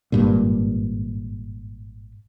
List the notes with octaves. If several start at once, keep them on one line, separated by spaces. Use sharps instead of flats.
G#1 G2 A#2